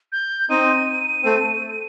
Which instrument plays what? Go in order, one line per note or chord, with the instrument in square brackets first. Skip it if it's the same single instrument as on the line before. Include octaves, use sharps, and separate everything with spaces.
[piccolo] G6
[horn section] C4 D#4 [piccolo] D#7
[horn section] A3 C4